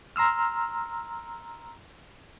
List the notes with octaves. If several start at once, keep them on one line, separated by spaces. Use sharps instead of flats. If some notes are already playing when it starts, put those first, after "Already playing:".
A#5 C6 E6 F6